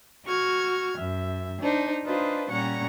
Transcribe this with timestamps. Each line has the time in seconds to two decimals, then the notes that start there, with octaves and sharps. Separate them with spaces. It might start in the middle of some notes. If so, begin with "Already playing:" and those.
0.24 F#4 C#6 F6 G#6
0.97 F#2 E5
1.60 D4 D#4 C5
2.04 D4 D#4 F4 B4 C5
2.49 A#2 G3 C#4 F#5 A#5 C#6